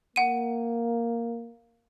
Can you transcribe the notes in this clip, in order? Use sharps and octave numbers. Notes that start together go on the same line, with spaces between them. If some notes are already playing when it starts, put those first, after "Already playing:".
A#3 F#5 D#7